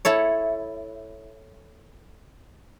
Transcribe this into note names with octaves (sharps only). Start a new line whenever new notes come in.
E4 A4 C#5